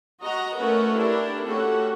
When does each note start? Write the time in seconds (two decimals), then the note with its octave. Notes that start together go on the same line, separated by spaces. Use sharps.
0.23 F#4 D#5 A#5
0.56 A3 C#4 F#4 A#4 B4
0.98 D4 E4 G4 A#4
1.48 A3 C#4 F#4 G4 A4